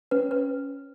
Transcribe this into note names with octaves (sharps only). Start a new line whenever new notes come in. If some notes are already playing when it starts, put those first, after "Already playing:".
C#4 B4
B4